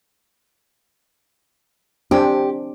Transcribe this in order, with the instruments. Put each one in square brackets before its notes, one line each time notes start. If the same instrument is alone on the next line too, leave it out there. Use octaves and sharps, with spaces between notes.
[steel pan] C4 D4 G#5 [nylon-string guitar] G4